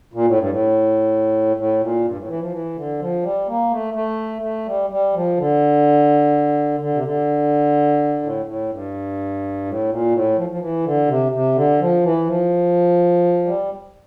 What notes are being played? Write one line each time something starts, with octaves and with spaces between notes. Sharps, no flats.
A#2
A2
G2
A2
A2
A#2
G2
A2
E3
F3
E3
D3
F3
G3
A#3
A3
A3
A3
G3
G3
F3
D3
D3
C3
D3
A2
A2
G2
A2
A#2
A2
F3
F3
E3
D3
C3
C3
D3
F3
E3
F3
G3